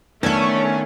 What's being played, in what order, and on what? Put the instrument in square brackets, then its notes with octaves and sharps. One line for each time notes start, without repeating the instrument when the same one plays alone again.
[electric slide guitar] D#3 B3 D4 [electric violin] A3 [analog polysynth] C#4 [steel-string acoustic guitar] A4 C#5